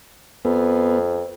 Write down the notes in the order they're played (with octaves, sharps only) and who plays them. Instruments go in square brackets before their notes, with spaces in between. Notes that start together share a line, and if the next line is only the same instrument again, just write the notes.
[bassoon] F2 [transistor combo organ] B3